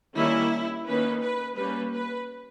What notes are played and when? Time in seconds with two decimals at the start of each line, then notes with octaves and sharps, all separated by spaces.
0.16 D#3 G3 A#3 C#4 E4
0.86 D#3 A#3 C#4 B4
1.22 B4
1.57 G3 A#3 C#4 B4
1.93 B4